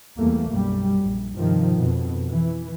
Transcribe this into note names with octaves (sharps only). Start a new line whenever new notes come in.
E2 G3 A3 A#3
B1 F#2 G3
A#1
G2 C3 D#3 F3
F2 B2
E3